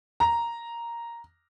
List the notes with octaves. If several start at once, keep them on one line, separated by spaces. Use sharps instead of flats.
A#5